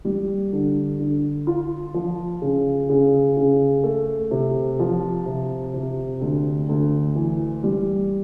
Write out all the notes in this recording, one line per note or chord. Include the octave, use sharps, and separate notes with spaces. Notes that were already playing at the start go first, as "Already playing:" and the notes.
G3
D3
D3
F4
F3
C#3
C#3
C#3
A3
C3
F3
C3
C3
D2
D2
E3
G3